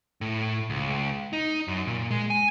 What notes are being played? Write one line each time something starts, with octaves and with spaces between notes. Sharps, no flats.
A2
C#2
D#4
F#2
A#2
G#3
G#5